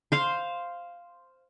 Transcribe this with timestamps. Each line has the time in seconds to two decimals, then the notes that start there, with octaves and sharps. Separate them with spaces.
0.12 C5 F5 C6